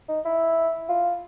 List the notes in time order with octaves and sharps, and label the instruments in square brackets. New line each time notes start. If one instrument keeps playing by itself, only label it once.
[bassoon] D#4
E4
F4